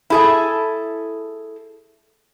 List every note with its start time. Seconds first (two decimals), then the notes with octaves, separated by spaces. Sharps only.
0.10 E4 G#4 A4